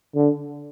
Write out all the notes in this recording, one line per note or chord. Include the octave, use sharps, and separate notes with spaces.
D3